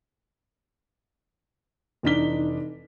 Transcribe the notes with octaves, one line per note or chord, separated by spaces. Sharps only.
F1 E3 D4 D#4 B6 G7